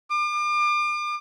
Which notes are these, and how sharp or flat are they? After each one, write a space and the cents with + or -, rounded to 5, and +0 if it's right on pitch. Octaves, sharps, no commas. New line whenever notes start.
D6 +40